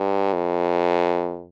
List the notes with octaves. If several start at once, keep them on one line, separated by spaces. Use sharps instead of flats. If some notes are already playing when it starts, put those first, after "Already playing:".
Already playing: G2
F2